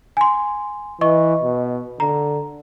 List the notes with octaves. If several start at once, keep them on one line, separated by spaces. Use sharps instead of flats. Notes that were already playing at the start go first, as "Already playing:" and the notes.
G#5 C6
E3 D#5 C#6
B2
D3 A#5